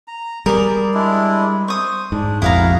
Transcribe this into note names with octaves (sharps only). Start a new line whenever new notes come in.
A#5
G3 G#4 A#4 D5
G#3 D4 E4
C5 C#6 D#6
G#2 D4
F1 A#1 F2 E4 F#4 G#4 F5 A#5